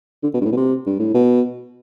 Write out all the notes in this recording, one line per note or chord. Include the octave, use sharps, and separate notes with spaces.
D3
B2
G2
A2
B2
C3
G2
A2
B2